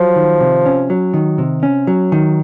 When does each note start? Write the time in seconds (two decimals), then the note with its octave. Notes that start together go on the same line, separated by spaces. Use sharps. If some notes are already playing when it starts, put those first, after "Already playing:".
Already playing: F3 F#3
0.16 D#3
0.40 C3
0.65 C#4
0.90 F#3
1.14 D#3
1.38 C3
1.63 C#4
1.87 F#3
2.12 D#3